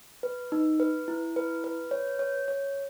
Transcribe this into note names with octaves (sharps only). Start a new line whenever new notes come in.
B4
D#4
B4
E4
B4
B4
C#5
C#5
C#5